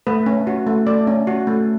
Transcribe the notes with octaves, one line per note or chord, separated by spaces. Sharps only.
A3 B4
C#4
F#4
A3
A3 D5
C#4
F#4
A3